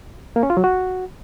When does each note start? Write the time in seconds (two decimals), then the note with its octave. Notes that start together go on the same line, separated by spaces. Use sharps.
0.36 A#3
0.43 C#4
0.50 F4
0.57 F#3
0.64 F#4